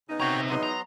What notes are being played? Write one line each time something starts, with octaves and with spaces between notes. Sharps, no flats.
C#3 B3 D#4
C3 F#4 C#5 G5 A#5
E2 F#3 B3 D#4 C6
A#5